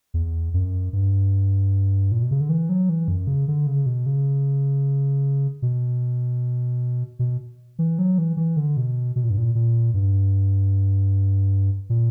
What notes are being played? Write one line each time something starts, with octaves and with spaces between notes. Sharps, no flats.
E2
F#2
G2
A#2
B2
C#3
D3
E3
F#3
E3
F#2
C#3
D3
C#3
B2
C#3
B2
B2
E3
F#3
E3
E3
D3
B2
B2
A#2
G2
A#2
A#2
G2
A#2